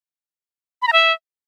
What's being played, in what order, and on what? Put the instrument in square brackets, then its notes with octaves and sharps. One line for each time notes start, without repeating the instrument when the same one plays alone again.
[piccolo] B5
A#5
E5